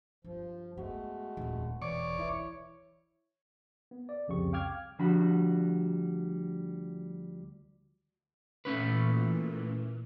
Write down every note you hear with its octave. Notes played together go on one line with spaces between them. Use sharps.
G2 F3
G#3 A3 B3 F#4
D#1 F2
E1 E3 C#5 D5 C#6
E3 E4
B3
D5
C2 F2 C#3 G4 C#6
F5 G5 D6 F6 G#6
D2 F3 G3 D4 F#4 B5
A#2 E3 A3 C#4 B4